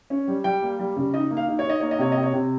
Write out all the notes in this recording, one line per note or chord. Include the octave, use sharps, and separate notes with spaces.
C#4
G3
G3 G5
A#3
G3
C#3
D#4 D#5
A#3
F5
D#4
C#5
D#4
D#5
A#3 C#5
D#5
C3 C#5
D#5
C3
C#5
C3